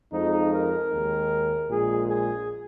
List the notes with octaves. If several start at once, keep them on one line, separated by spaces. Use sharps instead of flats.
F2 F3 G#3 D#4
A#4
D#2 D#3 G#3
A#1 A#2 G#3 G#4
G#4